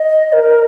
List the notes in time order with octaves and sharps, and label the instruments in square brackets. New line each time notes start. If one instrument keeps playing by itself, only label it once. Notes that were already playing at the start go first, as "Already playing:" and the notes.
Already playing: [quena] D#5
A#4